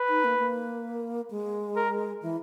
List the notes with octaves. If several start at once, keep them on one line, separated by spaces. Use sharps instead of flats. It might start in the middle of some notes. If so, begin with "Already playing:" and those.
Already playing: B4
D#4
A#3
A#3
G#3
A#4
E3